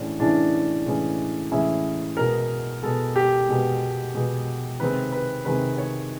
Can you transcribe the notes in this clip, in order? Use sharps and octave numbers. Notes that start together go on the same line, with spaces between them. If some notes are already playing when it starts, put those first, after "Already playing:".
Already playing: A2 E3 G#3 C#4 D4
A2 E3 G#3 C#4 D4
A2 E3 G#3 C#4
A2 E3 G#3 C#4 E4
B2 G#3 B3 A#4
B2 G#3 B3 A4
G4
B2 G#3 B3
B2 G#3 B3
C3 D#3 G#3 C4 B4
B4
C3 D#3 G#3 C4 B4
C#5